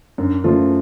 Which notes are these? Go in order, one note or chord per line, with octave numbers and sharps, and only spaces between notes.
F#2 D4
F3 A3 C#4 F4